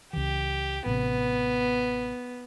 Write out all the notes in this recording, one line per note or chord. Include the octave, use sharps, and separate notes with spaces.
C#2 E3 G4
A1 C3 B3